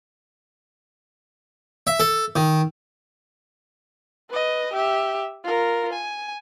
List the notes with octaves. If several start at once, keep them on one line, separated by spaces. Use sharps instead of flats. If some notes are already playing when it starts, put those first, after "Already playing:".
E5
A4
D#3
B4 D#5
G4 E5
F4 A#4
G#5